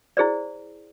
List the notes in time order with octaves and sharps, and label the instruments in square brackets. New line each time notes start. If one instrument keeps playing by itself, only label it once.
[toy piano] E4 G#4 C5 D5